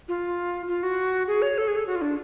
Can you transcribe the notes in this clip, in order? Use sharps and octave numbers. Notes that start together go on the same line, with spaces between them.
F4
F4
F#4
G#4
C#5
A4
G#4
A4
F#4
F4
D4